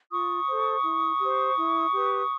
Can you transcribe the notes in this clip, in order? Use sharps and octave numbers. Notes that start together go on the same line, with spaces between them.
F4 C#6 D#6
A4 C5
E4
G4 C5
E4
G4 B4